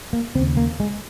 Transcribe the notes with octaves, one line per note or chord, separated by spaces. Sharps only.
A#3
D#2 C#3 C4
A#3
G#3